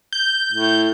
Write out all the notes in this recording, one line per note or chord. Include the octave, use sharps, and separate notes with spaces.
G6
A2